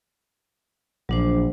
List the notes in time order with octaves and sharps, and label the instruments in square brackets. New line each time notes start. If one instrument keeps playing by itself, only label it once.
[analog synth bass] A#1 [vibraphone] F#3 D4 C5